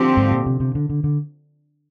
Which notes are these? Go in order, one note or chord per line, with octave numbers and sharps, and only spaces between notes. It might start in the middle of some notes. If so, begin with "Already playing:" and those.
Already playing: D3 F3 C4 G4
G#2
A#2
C3
C3
D3
D3
D3